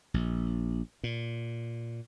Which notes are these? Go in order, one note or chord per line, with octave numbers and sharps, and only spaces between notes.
A#1
A#2